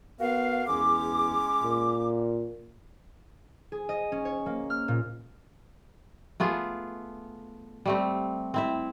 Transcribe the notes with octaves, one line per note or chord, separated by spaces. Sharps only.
B3 F#4 A#4 F5
E2 G#3 C#4 D6
A#2
G#4
D#5
C#4
C#5
A#3
F6
A#2
A3 B3 F4 G#4
G3 A3 C4
C4 E4 E5